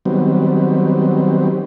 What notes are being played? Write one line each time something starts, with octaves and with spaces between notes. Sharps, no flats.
D#3 F#3 G3 B3 C4